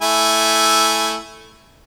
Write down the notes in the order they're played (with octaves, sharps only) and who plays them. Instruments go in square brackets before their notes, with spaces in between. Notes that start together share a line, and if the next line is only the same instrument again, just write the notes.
[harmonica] A3 E4 G#5